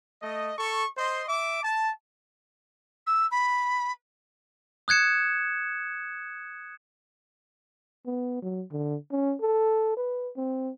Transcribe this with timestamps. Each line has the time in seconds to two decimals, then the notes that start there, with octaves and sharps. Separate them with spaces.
0.22 A3 D#5
0.58 A4 C#6
0.98 C5 D#5 C6
1.28 E5 D6
1.62 A5
3.06 E6
3.31 B5
4.88 D#6 F#6 G#6 C#7 E7
8.06 B3
8.42 F#3
8.72 D3
9.12 C#4
9.41 A4
9.97 B4
10.37 C4